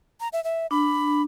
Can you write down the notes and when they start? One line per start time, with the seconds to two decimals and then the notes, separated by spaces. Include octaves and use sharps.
0.21 A#5
0.33 E5
0.44 E5
0.71 D4 B5